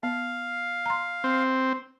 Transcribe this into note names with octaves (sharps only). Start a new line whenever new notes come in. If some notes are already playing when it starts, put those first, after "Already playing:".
B3 F5
A#5 C6
C4